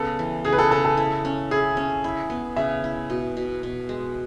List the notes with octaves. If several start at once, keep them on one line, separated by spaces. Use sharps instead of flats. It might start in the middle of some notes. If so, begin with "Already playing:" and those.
Already playing: C#3 B3 A4
E3
C#3 G#4
B4
A4
C#3 A4
A4
E4
C#4
E4 G#4
C#4
E4
B3
C#3 E5
E4
B2
B2
B2
G#3